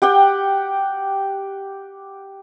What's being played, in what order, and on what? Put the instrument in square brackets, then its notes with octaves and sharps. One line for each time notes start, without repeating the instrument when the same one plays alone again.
[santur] G4 F#5 G5